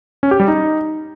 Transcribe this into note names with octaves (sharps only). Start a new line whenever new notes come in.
C#4
G4
G3
D#4